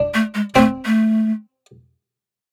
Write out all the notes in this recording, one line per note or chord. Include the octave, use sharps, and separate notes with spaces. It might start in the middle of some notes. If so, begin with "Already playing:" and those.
Already playing: D4
A3
G#3
A3 C4
A3